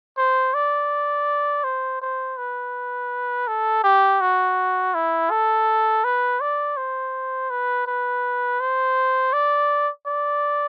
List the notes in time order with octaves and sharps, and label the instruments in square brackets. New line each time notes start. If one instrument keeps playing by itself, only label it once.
[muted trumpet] C5
D5
C5
C5
B4
A4
G4
F#4
E4
A4
B4
D5
C5
B4
B4
C5
D5
D5